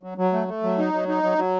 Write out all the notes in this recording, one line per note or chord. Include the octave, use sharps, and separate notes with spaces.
F#3
F#3
A3
A3
F#3
D#4
F#3
D#4
F#3
F#3